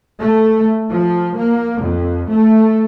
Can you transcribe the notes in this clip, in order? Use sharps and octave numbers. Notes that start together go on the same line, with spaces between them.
A3
F3
A#3
F2
A3